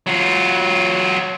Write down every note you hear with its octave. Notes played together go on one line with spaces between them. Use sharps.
F#3 F4